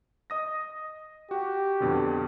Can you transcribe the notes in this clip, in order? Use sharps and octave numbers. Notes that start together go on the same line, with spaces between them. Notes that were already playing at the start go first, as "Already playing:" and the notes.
D#5 D#6 A#6
F#4 G4
F2 B2 D3